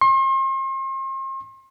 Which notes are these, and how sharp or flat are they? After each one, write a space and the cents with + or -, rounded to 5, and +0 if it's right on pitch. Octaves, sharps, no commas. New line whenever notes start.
C6 +40